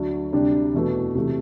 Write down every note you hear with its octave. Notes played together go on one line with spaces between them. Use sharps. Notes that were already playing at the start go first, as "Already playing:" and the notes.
Already playing: D2 D3 F#3
D2 C3 G3 D4 G4
E2 B2 A3
C3 E3 A3